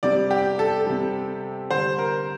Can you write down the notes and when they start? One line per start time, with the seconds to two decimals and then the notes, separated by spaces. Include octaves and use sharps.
0.03 C3 G3 D5
0.31 G4
0.59 A4
0.86 C3 G3
1.70 D3 G3 C5
1.99 A#4